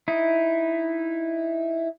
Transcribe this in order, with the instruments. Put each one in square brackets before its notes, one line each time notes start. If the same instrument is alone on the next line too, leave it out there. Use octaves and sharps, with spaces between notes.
[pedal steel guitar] D#4 E4